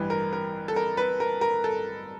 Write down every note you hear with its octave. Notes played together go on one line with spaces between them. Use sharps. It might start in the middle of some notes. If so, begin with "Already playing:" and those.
Already playing: A1 G2 E3 G3 B4
A#4
A#4
A4
A#4
B4
A#4
A#4
A4